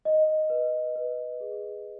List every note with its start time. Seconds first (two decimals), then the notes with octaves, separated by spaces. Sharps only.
0.05 D#5
0.50 B4
0.96 B4
1.41 G#4